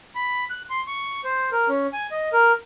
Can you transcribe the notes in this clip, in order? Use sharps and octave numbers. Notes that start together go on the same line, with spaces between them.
B5
F#6
C6
C#6
C5
A#4
C#4
G#5
D#5
A#4